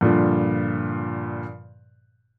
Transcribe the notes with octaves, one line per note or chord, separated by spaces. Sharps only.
G2 A#2 D3 F3